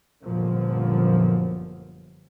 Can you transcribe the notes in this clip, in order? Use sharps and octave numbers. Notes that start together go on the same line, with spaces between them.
G1 F#2 A#2 F3